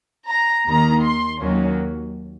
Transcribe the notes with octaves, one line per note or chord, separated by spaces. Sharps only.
A#5
D#2 D#3 A#3 A#5
C6
D#2 D#3 F#3 A#3 C#4